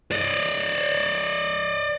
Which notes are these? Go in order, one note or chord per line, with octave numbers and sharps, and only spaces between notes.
D5 D#5